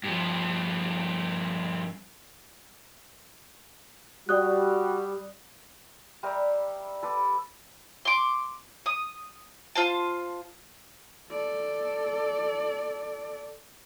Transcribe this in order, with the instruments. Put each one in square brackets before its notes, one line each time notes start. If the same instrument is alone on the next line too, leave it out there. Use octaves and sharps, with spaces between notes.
[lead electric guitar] G2 F3
[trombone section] G3 [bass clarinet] F#4 [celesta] D5 D#6 F#6
[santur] G3 G4 A#4 E5
A4 B4 D6
[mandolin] C6 D6
D#6
F4 C5 A5
[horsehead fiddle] A4 D5